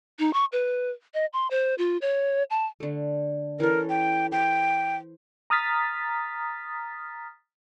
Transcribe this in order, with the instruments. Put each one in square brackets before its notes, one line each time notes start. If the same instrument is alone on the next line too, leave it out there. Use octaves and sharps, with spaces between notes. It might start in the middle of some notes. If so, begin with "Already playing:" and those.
[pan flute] D#4
C#6
B4
D#5
C6
C5
F4
C#5
A5
[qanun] D3 A3
[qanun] E3 C#4 A4 [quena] A#4
[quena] G5
[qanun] C5 [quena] G5
[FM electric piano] A#5 D#6 F6 A6 B6